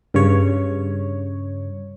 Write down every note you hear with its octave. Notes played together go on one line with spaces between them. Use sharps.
G2 C#3 C#5